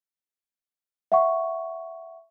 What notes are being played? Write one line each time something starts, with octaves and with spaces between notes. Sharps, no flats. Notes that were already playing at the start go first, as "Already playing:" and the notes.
E5 F#5 C#6